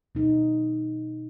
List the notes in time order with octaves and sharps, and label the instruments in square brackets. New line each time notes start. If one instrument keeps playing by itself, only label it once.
[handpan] B2 D#4